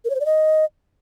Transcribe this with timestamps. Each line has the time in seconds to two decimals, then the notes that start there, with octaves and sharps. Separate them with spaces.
0.05 A#4
0.10 C#5
0.15 C5
0.20 D5
0.25 D#5